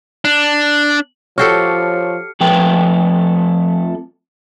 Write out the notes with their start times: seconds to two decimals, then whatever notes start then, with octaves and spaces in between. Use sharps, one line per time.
0.25 D4
1.38 F3 F#4 G4 A4 C#5 F6 C7 C#7
2.40 F2 F3 A3 B4 G5